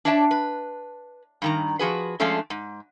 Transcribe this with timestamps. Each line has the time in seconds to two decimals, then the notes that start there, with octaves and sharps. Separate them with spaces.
0.05 D4 C#5 D5 E5 F#5 A5
0.31 B4
1.42 G2 D#3 A#5
1.79 F3 F#4 G#4 B4
2.20 F3 G#3 A3 C#4 D4 A4
2.50 G#2